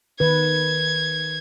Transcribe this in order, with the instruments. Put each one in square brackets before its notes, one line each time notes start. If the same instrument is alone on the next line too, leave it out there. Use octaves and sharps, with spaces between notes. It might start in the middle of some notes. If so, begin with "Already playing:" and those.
[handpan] D#3 B4 [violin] G#6